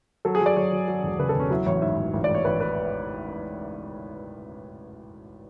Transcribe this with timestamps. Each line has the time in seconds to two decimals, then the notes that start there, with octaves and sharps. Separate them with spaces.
0.25 F#3 A4
0.35 G#4
0.41 F#3
0.46 D5
0.56 F#3 C#5
0.72 F#3
0.88 F#3
1.03 E1
1.19 C#3 B4
1.29 A4
1.35 E1 C#4
1.50 F#3 E4
1.66 A1 C#5
1.82 G#2 E5
1.97 A1
2.13 A1
2.24 A1 D5
2.35 C#5
2.45 A1 B4
2.60 B4